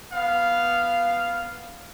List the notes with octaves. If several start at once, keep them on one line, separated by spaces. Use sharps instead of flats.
B3 F5